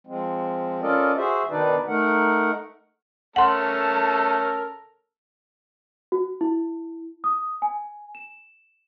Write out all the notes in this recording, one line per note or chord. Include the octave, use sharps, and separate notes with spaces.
F3 G#3 C4
C#4 F4 A4 A#4 D5 D#5
F#4 G#4 C5 E5
B2 D#3 D4 D#4 B4 D5
A3 D#4 A#4 F#5
A3 C#4 A4 A#4 F#5 A5 C6
F#4
E4
D#6
G#5
E7